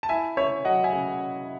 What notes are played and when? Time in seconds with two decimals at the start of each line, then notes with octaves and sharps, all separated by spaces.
0.03 A5
0.09 E4 E5 G#5
0.37 C#4 C#5 E5
0.65 F#3 D#5 F#5
0.84 E5 G#5
0.92 C#3